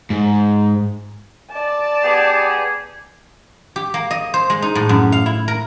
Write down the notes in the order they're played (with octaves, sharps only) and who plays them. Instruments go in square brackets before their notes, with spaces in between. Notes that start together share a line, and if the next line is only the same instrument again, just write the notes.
[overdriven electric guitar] G#2
[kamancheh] D5 A5
[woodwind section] B3 G4 G#4
[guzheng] G4
A#3
D#5
C5
G#3
D#4
A2
F#2
F5
E4
A#4